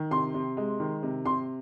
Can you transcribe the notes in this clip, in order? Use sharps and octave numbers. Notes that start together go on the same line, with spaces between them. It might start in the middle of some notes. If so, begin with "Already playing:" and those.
Already playing: D#3
C3 C6
C3
G#3
D#3
C3
C3 C6